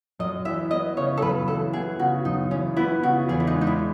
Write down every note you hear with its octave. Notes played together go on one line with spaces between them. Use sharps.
F#2 D#5
E3 E5
B3 D#5
C#3 C#5
A4
F#2 B4
E3 A4
B3 G#4
C#3 F#4
F#2 D#4
E3 C#4
B3 E4
C#3 F#4
E2 G#4
E4
D#4
G#3
D#4
E4